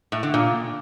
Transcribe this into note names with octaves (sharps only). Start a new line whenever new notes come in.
A2
D3
A#2